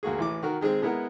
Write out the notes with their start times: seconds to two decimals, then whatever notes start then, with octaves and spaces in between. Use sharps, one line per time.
0.03 D2 A#3 F#4 G#4
0.18 A1 E3 D6
0.42 D#3 F#4 A#4
0.61 D#3 G#3 C4 G#4
0.82 G#3 B3 E4 A#4 F#5